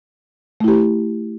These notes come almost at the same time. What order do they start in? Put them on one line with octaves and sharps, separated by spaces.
A3 E4 G4